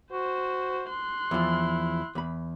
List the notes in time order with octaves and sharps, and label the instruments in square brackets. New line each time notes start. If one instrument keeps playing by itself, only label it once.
[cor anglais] F#4 [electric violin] C5
[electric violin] C6 F#6
[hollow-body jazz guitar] E2 F3 [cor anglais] E4
[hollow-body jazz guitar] E2 B5